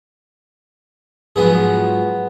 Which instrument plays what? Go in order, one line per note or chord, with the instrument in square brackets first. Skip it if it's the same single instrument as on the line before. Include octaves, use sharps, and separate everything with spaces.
[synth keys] G#2 F3 F#3 [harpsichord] B3 G#4